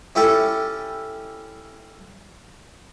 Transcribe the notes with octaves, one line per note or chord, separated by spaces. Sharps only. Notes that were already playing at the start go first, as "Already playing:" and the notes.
C#4 E4 G4 A4